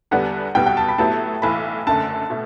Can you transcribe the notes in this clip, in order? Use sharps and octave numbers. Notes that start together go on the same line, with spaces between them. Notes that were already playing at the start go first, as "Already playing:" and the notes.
E2 D3 G3 B3 D4 F#5
B1 B2 G3 B3 G5
G5
A5
B5
A2 F#3 B3 E4 G4 A5
B1 A2 E3 B5
F#1 F#2 D3 A3 A5
B2 A3